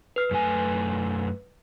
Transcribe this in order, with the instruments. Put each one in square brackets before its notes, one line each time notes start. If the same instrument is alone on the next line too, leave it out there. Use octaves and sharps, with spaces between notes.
[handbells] B4 F6 C7
[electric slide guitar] F#2 A3 G#5